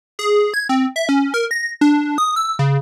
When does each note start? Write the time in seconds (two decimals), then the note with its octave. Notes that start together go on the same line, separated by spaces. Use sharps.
0.19 G#4
0.54 G#6
0.69 C4
0.96 E5
1.09 C#4
1.34 A#4
1.51 A#6
1.81 D4
2.18 D#6
2.36 E6
2.59 C#3